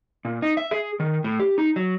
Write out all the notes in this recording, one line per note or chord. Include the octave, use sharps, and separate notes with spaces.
A#2
D#4
E5
G#4
D#3
A2
G4
D#4
F#3